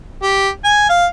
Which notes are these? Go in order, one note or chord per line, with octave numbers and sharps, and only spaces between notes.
G4
G#5
F5